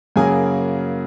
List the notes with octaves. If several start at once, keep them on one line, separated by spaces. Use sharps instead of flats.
F#2 C#3 F#3 A#3 G#4 G#5